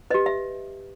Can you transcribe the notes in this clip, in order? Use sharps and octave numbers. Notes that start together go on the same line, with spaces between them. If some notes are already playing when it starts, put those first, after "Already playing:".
G4 B4 D#5
E5